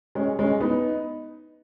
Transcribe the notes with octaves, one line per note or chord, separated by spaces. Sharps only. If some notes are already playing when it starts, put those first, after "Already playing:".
G#3 C#4
G#3 C#4
B3 D#4